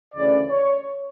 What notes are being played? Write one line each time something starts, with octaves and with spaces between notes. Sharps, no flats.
D2 C#3 E3 A3 C#4 D5
C#5